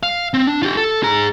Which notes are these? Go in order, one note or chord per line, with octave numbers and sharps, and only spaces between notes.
F5
C4
D4
F4 G4
A4
G#4 A#5